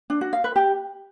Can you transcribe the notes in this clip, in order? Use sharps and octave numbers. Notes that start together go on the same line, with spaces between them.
D4
F#4
F5
B4
G4